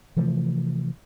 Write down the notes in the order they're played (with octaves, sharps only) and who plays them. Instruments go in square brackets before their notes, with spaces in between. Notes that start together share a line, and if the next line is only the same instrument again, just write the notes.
[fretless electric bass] C3 E3 F3 A3